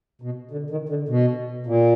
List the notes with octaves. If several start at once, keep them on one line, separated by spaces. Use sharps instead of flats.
B2
D3
D#3
D3
B2
A#2